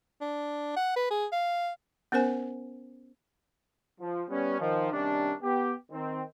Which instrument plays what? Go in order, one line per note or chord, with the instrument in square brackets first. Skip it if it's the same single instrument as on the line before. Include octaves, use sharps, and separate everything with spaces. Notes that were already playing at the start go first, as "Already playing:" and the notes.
[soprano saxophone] D4
F#5
B4
G#4
F5
[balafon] B3 C#4 A#4 C5 G#5
[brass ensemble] F3
G3 B3 C#4
D#3 F3
C3 D#3 G3 C#4 D4
B3 G4
D#3 C4